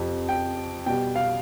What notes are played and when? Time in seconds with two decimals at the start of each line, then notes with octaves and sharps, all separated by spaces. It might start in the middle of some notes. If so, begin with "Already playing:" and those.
Already playing: F2 C3 F3
0.29 G5
0.86 B2 G3 G5
1.15 F5